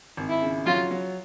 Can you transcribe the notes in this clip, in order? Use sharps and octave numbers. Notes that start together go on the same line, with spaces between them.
G#1
E4
C#3
F#3 F4
F#3